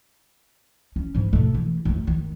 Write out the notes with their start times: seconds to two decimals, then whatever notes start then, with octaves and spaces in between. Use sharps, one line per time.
0.96 C#4
1.15 G#2 G3
1.33 B2 A3
1.55 E3
1.85 F#2 A3
2.07 D#3